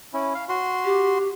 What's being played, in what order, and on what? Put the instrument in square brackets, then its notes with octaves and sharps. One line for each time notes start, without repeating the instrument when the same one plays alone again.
[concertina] C#4 E4
F5
F#4 C6
[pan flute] G4